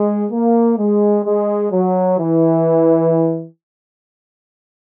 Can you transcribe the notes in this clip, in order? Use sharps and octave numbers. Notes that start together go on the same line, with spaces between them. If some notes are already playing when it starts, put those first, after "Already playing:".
Already playing: G#3
A#3
G#3
G#3
F#3
E3